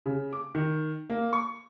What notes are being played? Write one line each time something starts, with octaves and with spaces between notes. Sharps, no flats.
C#3
D6
D#3
A#3
C#6